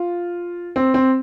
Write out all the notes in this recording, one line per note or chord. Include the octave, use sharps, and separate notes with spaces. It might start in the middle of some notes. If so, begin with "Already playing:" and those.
Already playing: F4
C4
C4